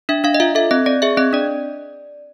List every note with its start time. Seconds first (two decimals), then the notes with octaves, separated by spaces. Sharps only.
0.09 D4 E5
0.24 D4 F5
0.34 D#5
0.40 F4 E5
0.55 A4 E5
0.71 C4 D#5
0.86 C4 D5
1.02 G#4 E5
1.17 C4 D#5
1.33 D4 D5